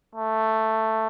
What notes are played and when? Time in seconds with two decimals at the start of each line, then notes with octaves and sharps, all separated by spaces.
0.15 A3